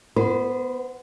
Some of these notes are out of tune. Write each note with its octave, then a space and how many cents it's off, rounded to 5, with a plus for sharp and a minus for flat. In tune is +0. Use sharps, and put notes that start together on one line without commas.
B3 +0 C5 -30